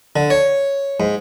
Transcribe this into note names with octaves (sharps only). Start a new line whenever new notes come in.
D3
C#5
G#2